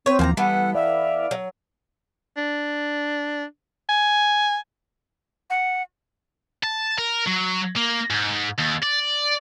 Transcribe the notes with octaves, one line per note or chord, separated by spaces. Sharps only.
C4 B4 C#5
D#2 E3 F3 A#3 G#5 A#5
E3 G3 B3 A4 F#5
D5 E5 F5
F#3
D4
G#5
F#5
A5
A#4
F#3
A#3
G#2
D#2
D5